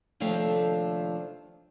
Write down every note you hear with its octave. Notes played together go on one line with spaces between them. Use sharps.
D#2 C3 F3 A3 D4 F5